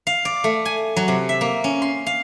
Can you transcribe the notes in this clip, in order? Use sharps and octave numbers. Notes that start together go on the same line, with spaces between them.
F5
D5
A3
G#5
F#3
C3
E5
A#3
C#4
C6
F5